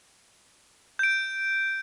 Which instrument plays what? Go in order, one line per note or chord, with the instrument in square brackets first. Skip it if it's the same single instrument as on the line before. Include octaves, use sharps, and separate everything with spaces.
[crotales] G6 D7